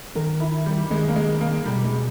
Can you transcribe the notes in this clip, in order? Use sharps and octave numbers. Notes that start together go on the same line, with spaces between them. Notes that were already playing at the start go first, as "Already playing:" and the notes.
D#3 A#4
E4
G3
D#3 G#3
A#3
G#3
A#3
B2 G3
G#3